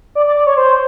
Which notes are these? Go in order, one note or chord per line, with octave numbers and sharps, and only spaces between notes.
D5
D5
D5
C#5
C5